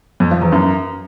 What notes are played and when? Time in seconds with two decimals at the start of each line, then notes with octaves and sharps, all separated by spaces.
0.20 F2
0.31 F3
0.42 E2
0.52 F#2